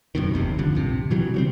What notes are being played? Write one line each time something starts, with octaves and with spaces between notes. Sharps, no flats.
C#2 F#2 B2 D#3
F1 D#2 C3
D2 G2 D3 F3
A#1 C3
B2 E3 F#3 G3
C#3 B3 C4